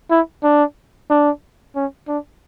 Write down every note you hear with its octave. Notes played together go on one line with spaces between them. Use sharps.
E4
D4
D4
C#4
D4